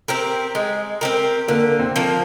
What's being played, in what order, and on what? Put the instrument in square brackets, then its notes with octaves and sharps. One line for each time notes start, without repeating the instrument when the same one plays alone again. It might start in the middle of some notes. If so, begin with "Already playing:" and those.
[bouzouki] C4 G4 A#4
G#3
C4 G4 A#4
[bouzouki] D3 [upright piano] A#3
[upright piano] C4
[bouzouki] F3 A#3